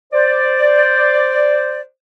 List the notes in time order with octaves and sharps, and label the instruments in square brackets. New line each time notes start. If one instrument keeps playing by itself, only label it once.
[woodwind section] C5 D5